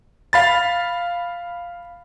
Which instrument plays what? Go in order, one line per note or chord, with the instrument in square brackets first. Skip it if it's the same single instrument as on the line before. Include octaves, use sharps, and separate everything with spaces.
[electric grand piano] F5 B5 A6